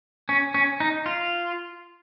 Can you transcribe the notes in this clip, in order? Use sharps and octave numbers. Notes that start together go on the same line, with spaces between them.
C#4
C#4
D#4
F4